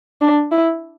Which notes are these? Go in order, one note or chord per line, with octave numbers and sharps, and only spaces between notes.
D4
E4